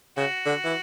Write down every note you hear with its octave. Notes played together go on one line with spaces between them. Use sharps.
C#3 F#4
D3
E3